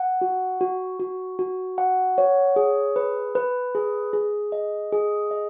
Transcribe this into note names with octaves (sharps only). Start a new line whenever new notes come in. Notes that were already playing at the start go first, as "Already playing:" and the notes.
Already playing: F#5
F#4
F#4
F#4
F#4
F#5
C#5
G#4
B4
B4
G#4
G#4
D#5
G#4
D#5